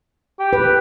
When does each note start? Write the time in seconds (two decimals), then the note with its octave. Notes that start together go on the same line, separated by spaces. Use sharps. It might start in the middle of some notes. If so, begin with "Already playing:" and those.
0.40 G4
0.53 B4